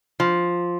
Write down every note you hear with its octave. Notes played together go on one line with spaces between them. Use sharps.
F3